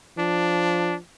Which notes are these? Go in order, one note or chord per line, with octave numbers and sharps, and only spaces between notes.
F3 D4